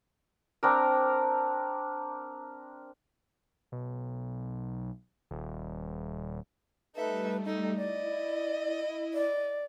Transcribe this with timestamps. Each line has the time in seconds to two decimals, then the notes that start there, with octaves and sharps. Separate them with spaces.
0.63 C4 D4 A#4
3.72 B1
5.31 D#1
6.96 G3 A3 D#4 A4 B4 E5
7.46 D#4 A4
7.76 E4 D5 D#5
9.14 D5